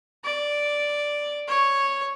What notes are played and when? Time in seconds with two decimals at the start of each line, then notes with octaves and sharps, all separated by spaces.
0.24 D5
1.48 C#5